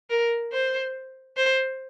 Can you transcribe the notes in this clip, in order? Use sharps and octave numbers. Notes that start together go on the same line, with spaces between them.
A#4
C5
C5